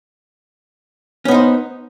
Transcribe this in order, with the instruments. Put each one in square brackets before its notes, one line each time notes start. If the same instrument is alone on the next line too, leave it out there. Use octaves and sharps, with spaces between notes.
[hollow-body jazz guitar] C#4
B3
D#4
C5